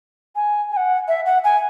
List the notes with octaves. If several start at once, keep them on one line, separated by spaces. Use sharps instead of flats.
G#5
G#5
F#5
E5
F#5
G#5